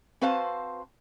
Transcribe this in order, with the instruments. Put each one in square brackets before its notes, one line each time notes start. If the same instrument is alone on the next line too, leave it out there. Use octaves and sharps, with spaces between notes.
[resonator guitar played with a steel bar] C4 F#4 B4 C5 F5 A5